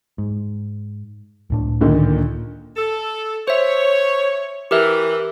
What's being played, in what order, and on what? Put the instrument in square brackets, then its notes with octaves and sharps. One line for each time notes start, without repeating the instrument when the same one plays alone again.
[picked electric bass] G#2
C#2 A2 D4
[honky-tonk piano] A#2 D3 D#3
[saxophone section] A4
[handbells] C5 E5 [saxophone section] C#5
[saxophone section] E3 [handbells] G4 A#4 E5